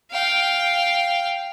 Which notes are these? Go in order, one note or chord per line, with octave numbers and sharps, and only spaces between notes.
F5 G5